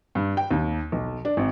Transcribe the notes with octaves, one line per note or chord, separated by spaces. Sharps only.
G2
G5
D#2
B1
D4
G#1